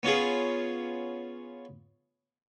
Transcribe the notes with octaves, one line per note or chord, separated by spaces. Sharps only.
B3 C#4 F4 G#4